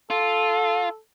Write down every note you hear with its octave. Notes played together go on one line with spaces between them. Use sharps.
F4 A4